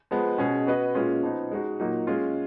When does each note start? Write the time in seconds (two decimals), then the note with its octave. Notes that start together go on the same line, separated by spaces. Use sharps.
0.11 F3 G#3 B3
0.38 B2 G#3 C#4 G#4
0.67 B3 F#4 B4 D#5
0.95 A#2 G#3 C#4 F4
1.23 F3 B3 D#4
1.51 G#3 D#4 F#4
1.80 A#2 F#3 A#3 D#4
2.07 G#3 C#4 F4